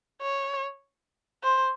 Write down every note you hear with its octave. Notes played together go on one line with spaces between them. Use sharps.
C#5
C5